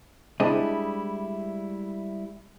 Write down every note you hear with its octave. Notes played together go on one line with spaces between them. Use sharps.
G3 G#3 D4 E4 C5 D#5